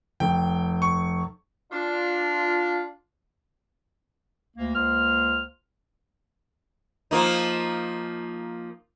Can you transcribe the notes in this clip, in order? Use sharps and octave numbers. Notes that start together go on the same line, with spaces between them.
F1 G5
C#6
D4 F4
D2 A#3
C#2 A#3 C5 F6
F3 A#3 D#4